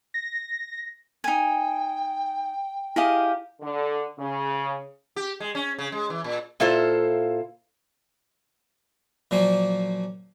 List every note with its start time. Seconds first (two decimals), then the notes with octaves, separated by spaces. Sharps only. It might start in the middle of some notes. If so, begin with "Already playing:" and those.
0.14 A#6
1.24 D#4 G5 G#5
2.96 E4 G4 G#4 D#5 F5
3.61 D3
4.19 C#3
5.16 G4
5.40 G#3
5.55 C#4
5.79 C#3
5.92 G#3
6.10 E3
6.24 A#2
6.60 A#2 E4 F4 A4 C5
9.31 A#2 F3 F#3 A#3